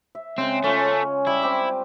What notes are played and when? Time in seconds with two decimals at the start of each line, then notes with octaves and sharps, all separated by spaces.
0.15 E5
0.38 C#3 G#3 C4
0.64 A3 C#4 F4
1.27 G3 E4
1.42 C4 G5 D6